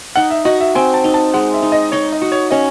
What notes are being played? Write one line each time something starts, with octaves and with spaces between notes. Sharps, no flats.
D#4 F#5
E5
F#4 D#5
E5
C4 G#5
A5
D#4
A5
G#3 F#5
E5
D#4
D#5
D#4 C#5
D#5
F#4
C#5
C#4 D#5